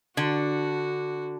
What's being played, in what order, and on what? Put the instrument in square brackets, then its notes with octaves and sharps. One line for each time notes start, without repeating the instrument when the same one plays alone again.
[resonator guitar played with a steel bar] D3 [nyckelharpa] F#4